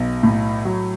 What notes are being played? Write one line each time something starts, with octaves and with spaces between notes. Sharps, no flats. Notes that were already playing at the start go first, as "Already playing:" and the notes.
Already playing: B1
A2
F#3